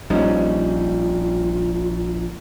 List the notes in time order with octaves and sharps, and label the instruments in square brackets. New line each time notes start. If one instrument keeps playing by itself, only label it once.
[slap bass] A#1 [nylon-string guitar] G3 C#4 D#4 [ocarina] F4